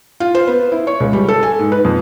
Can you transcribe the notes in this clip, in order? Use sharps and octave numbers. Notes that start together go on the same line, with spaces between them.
F4
C5
B3
E4
C#5
C#2
G3
A4
G#5
G#2
B4
F2